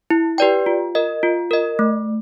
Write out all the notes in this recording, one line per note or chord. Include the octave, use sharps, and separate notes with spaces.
E4
G4 B4 D5 G5
F4
A#4 D#5
F4
A#4 D#5
A3